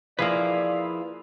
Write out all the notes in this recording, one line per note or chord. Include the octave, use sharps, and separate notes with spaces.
F3 A#3 E4 G#4 B4 D5 F5